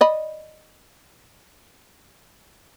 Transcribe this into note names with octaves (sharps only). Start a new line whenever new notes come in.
D5 D#5 B5